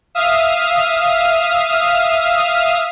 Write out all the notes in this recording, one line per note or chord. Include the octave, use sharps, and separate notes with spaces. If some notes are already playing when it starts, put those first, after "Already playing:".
E5 F5 D#6 F6